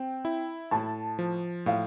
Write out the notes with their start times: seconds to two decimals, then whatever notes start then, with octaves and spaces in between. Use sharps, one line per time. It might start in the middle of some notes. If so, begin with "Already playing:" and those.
Already playing: C4 G5
0.25 E4
0.71 A2 A5
1.19 F3
1.66 A2 F5